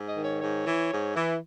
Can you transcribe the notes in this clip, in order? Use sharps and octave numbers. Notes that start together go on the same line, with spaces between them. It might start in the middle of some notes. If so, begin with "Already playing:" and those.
Already playing: G#2
D#5
D#3
C#5
G#2 C#5
E3
G#2
E3